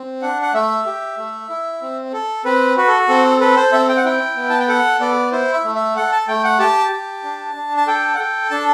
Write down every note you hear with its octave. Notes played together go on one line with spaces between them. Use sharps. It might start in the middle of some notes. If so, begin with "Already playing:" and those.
Already playing: C4
D4 F#5
F#5
A3 E5
G4
A3
E4
C4
A4
C4 B4
F#4 B4
A4
C4 A4
A4 B4
C5
C4 E5
G5
F#5
E4 G5
B3
A5
G5
A4 F#5
B3 D5
E4 C5
E5
A3
E5
A4 F#5
A5
A3 G5
F#5
G4 A5
G4
D4
D4
A5
A4 G5
F#5
A4 G5
D4 A5